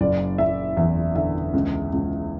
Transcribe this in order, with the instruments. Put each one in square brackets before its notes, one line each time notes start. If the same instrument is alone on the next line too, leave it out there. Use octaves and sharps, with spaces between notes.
[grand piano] F#1 D5
F#1 E5
E2 E5
D3 E5
C#2
C#2